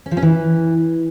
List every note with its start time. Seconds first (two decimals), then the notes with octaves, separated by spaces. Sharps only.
0.06 C#4
0.11 F3
0.17 C#4
0.22 E3